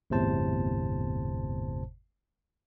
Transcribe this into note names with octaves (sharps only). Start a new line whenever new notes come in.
G1 E2 A2 C3 C5 A5